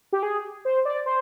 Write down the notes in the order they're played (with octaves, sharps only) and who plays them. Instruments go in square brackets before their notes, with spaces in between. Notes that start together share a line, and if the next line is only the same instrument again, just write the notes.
[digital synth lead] G4
G#4
C5
D5
C5